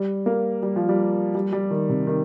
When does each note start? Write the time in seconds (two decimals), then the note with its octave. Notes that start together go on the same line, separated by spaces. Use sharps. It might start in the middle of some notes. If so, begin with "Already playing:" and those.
Already playing: G3
0.26 A#3
0.63 G3
0.76 F3
0.89 G3
1.35 G3
1.53 G3
1.71 D#3
1.89 C3
2.07 D#3